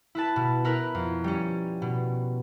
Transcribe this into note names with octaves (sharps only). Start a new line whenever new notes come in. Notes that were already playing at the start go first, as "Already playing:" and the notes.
E4 B4 A5
B2
E4 A#4 B4
F2
G3 C#4
B2